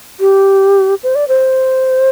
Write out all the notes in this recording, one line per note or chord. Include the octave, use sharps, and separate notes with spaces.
G4
C5
D5
C5